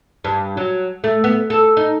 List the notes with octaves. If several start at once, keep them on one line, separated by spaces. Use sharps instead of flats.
G2
F#3
A3
B3
A4
D#4